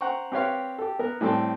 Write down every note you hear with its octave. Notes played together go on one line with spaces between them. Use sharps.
C5 F#5 G5 A#5 C#6
C4 G4 B4 C#5 F5
G4 A4
B3 A#4
A2 G3 A3 C4 A5